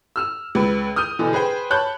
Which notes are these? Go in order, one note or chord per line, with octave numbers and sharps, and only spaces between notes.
E6 F6 E7
C#2 B4
D#6 F6 G6 D#7
B2 D3 E3
G#4 B4 C5 G5
C#5 A5 B5 F#6 G6